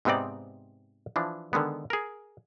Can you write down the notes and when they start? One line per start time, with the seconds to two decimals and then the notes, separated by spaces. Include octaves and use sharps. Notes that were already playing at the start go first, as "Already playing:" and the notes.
0.05 G#2 C3 B3 C4 D#4 D5
1.16 E3 F3 D4
1.53 D3 D#3 G#3 B3
1.90 G#4 A#4